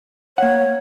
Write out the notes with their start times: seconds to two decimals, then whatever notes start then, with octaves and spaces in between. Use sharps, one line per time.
0.38 A#3 C#5 F#5